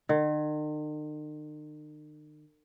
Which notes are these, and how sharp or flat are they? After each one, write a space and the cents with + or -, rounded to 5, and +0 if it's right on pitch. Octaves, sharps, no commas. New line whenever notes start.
D#3 -45